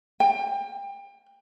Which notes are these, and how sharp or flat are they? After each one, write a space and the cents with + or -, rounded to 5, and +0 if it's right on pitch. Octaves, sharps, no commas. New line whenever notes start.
G5 +30